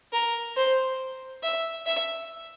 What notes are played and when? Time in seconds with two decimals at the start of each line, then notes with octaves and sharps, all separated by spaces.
0.12 A#4
0.56 C5
1.43 E5
1.86 E5